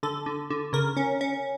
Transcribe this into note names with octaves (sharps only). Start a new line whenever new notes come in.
D3 A4
D3
D3
C#3 A#4
C#4
C#4